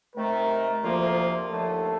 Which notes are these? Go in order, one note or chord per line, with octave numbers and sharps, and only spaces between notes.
C3 D#3 A3 A#4
D2 C3 F3 A#3 F4
D#2 D3 F3 A3 A4